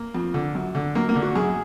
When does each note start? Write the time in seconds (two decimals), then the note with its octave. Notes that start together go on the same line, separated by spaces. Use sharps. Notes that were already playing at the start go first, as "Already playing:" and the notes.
Already playing: A#3
0.15 F2
0.34 D3
0.55 F#2
0.75 D3
0.95 F#2 A#3
1.09 A#3
1.16 D3
1.22 F#4
1.35 F#2 G#4